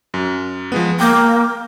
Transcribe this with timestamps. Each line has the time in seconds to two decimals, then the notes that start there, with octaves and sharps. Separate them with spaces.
0.14 F#2
0.72 F3 G#3 B3
1.00 A#3 G5 D6 G6